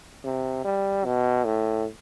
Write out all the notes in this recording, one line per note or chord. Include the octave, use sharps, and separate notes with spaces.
C3
G3
B2
A2